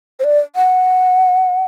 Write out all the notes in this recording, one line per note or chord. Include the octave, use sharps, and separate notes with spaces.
C5
D5
F#5